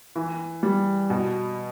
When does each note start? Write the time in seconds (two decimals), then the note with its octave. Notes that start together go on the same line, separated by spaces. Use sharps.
0.16 E3
0.63 G3
1.10 B2